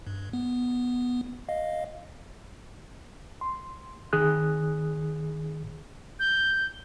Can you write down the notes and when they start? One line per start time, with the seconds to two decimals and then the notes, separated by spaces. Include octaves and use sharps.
0.07 G2
0.33 B3
1.49 D#5 F5
3.41 C6
4.13 D#3 G#4 D#6 F#6
6.19 G6